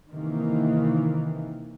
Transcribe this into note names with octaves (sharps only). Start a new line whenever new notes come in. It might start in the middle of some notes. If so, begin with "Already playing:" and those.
C3 D#3 E3 A#3